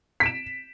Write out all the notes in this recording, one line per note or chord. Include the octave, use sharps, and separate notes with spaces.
B6 D7 E7